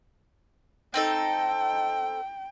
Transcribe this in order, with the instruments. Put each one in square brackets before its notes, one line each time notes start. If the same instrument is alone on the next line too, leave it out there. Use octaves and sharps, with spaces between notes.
[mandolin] C4 D#4 A4 [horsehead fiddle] G5